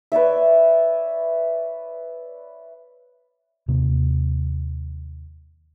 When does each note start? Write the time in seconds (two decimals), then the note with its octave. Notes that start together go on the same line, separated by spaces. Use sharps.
0.12 B4 C#5 D5 E5
3.68 D#2 C3 A#3